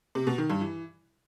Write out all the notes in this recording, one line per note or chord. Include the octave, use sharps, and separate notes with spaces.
C3
B2
D#3
G2
E3